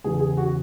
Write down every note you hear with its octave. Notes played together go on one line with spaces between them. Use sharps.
E2 C#3 E3 G#4
G#4
F#4